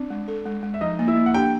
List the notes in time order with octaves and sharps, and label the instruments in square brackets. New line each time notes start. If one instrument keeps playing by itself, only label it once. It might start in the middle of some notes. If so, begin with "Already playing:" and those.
Already playing: [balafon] C4 [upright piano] D4
[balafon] G#3
A4
G#3
G#3
[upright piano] E5
[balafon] F3 [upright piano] D#4 D#5
[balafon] A#3
[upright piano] E4 E5
[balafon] A#3
[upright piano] F#5
[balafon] D4 [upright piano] G4 G5